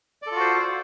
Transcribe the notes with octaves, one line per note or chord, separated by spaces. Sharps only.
F4 F#4 A4 C5 D5